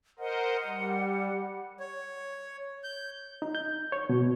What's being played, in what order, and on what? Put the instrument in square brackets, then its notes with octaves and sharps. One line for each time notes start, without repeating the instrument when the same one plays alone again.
[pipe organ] A#4 C5 D#5 [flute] F#5
[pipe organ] G3
[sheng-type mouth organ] C#5
G6
[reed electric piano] D#4
G6
C#5
B2